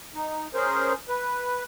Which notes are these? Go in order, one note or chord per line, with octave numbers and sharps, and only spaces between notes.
D#4
C#4 G#4 A#4 C5
B4